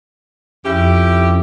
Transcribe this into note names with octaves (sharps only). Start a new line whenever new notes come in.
F2 C#4 E4 G4